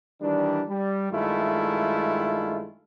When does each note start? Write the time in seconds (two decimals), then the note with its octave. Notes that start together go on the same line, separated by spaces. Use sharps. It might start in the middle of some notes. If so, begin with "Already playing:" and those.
0.22 D#3 E3 G3 D4
0.69 G3
1.12 G2 D#3 G#3 A3 E4 F4